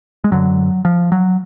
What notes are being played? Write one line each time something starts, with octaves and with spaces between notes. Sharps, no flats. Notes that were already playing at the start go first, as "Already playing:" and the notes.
G#3
F#2 D3 F#3
F3
F#3